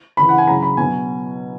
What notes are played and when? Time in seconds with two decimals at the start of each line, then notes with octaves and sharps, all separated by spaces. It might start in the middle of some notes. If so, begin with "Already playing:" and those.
0.17 C#3 E3 B5
0.29 F#5
0.38 G#5
0.47 C#3 F#3 A#5
0.62 B5
0.77 B2 F#3 G#5